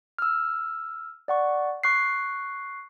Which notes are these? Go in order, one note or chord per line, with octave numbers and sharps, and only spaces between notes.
E6 F6
D5 F#5 C#6
C#6 F#6 C7